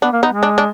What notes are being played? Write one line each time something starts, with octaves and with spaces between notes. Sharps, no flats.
B3 D4
A#3
B3 D#4
G#3
D4
D4